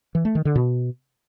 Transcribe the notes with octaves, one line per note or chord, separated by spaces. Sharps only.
E3
A3
D#3
D3
B2